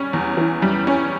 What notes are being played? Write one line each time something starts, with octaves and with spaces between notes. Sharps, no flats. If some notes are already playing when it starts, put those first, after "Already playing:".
Already playing: G3 C#4
E2
E3
G3
C#4